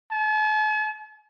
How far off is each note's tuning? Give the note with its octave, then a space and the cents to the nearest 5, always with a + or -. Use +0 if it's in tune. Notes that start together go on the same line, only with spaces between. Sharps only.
A5 -45